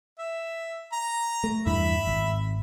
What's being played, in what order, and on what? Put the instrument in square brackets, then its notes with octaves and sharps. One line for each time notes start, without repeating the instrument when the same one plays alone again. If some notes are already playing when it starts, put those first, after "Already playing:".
[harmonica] E5
A#5
[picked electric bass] A3
[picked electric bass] E2 G2 E3 [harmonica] E5 B5
[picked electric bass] G#1